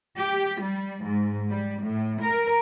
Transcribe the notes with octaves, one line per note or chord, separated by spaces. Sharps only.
G4
G3
G#2
G3
A2
A#4